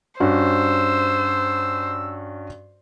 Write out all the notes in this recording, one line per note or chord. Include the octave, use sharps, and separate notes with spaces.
G2 C#4 F#4 C5 E6